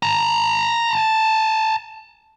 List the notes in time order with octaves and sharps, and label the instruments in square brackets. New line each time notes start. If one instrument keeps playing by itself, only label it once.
[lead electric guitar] A5 A#5